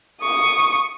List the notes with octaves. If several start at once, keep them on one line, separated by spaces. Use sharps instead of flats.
C#6 D#6